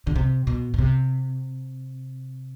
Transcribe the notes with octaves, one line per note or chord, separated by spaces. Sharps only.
D3
C3
B2
B2
C3